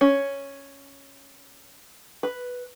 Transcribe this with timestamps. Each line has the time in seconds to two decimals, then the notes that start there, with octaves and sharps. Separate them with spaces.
0.01 C#4
2.23 B4